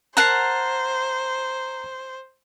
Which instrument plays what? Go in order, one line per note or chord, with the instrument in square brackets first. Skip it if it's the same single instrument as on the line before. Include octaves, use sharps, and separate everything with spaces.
[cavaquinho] A#4 F#5 A5 [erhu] C5 [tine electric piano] A#5 C7